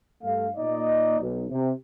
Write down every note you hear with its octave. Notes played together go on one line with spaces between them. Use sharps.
G2 A3 F5
A#2 A#3 D#4 D5 D#5
B1
C3